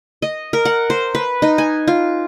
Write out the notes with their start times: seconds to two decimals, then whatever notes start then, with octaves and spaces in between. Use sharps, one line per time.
0.22 D#5
0.53 A#4
0.65 F#5
0.90 C5
1.15 B4
1.42 D#4
1.58 G#5
1.88 F4